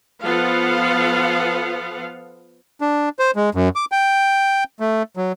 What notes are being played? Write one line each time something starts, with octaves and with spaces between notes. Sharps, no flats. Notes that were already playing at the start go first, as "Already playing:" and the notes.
F3 B3 F4 A4 F5 F#5
D4
C5
G#3
F#2
D6
G5
A3
F#3